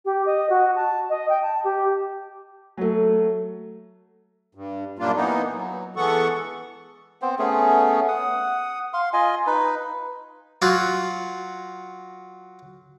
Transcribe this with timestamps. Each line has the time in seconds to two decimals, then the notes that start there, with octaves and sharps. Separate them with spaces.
0.05 G4
0.26 D#5
0.50 F#4
0.76 A5
1.10 D#5
1.29 G5
1.43 A5
1.64 G4
2.77 F#3 A3
4.55 G2
4.99 F#2 A#2 G3 A#3 D4 F4
5.15 E3 A#3 B3 D#4
5.54 F#3
5.96 E3 G#3 B3 A4 F#5 C#6
7.22 B3 C4 C5
7.39 A3 B3 C#4 G#4
8.08 F#5 D#6
8.93 F5 C6
9.13 F4 D#5 G#5
9.47 D#4 B4
10.62 F#3 F4 F#4